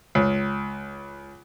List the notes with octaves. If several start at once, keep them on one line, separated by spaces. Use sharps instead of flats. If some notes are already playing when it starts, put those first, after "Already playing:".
C#2